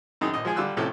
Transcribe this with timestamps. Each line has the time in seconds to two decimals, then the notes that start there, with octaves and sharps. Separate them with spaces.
0.21 F#2 D#3 D#4 G#4 D#6
0.34 A#1 D#5
0.45 F3 G#3 G#4 G#5
0.56 D3 G3 F4 E6 F#6
0.77 A1 A2 C3 F3 C#4 A4